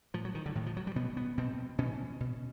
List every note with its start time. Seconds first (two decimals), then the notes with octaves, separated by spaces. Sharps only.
0.14 A2 F3
0.25 F#3
0.35 D#3
0.46 D3
0.55 A2 D#3
0.66 F3
0.77 F#3
0.87 G3
0.96 B2 B3
1.17 B3
1.38 B2 C4
1.78 B2 C#4
2.20 B2